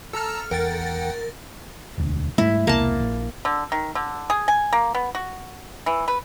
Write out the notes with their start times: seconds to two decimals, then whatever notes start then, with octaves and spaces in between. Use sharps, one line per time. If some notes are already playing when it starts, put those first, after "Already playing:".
0.13 A4 A5 A#5 E6 F6
0.51 E2 A#4 F#5 G5 A6
1.98 E1 D2
2.38 G#2 G3 A3 E4
2.67 E1 C2 A#3 A5
3.00 A#1
3.45 D3
3.72 D#3
3.95 D3
4.30 G#4
4.48 G#5
4.73 A#3
4.95 B3
5.15 F#4
5.86 E3
6.08 B4